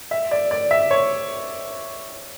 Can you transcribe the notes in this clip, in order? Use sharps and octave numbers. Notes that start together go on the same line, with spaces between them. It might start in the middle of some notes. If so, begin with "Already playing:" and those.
E5
D5
D5
E5
C#5